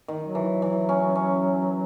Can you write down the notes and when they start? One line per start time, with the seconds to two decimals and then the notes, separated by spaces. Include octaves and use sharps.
0.08 D#3
0.21 F#3
0.35 E3
0.62 E3
0.89 C#4
1.15 C#4